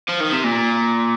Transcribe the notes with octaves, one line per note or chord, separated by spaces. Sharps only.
F3
D#3
C3
A#2